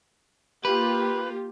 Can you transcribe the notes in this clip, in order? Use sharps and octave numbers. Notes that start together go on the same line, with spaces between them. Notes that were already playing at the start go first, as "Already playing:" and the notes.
A#3 F4 G4 B4